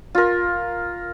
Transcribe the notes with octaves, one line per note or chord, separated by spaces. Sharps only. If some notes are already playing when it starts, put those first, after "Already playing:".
F4 A#4